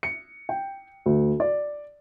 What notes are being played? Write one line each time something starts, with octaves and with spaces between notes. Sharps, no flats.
C#7
G5
D2
D5